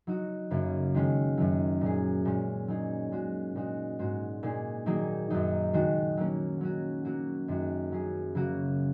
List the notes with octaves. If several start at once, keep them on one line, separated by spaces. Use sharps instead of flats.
F#3 D#4 F#4
F#2 C#3 A#3
D#3 G#3 C#4
F#2 D#3 F#3
A#2 F#3 C#4 G#4
A#2 G#3 C#4
F#3 A#3 D#4 G#4
A#2 G#3 C#4 F#4
A#2 G#3 D#4 F#4
G#2 G#3 F#4
A#2 A#3 D#4 G#4
D#3 F#3 A#3 D#4 G#4
F#2 D#3 F#3 D#4
D#3 G#3 F#4
F#3 A#3 C#4
F#3 C#4 F#4
F#3 A#3 F#4
F#2 D#3 G#3 F#4
F#3 C#4 G#4
C#3 F#3 A#3 F#4